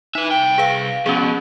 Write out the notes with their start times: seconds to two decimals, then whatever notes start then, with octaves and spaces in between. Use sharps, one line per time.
0.15 D#4 B4 E5
0.31 C2 G5
0.58 G#4 B4 F5
1.06 F2 B2 C#4 G#4